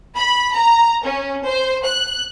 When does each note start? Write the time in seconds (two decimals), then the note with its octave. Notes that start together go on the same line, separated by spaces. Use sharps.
0.18 B5
0.55 A#5
1.04 C#4
1.46 C5
1.86 F#6